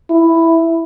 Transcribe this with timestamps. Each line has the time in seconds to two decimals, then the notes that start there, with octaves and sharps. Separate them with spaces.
0.10 E4